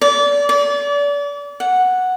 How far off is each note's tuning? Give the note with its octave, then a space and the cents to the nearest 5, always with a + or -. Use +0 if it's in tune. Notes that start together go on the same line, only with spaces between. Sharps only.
D5 -30
D5 -35
F#5 -5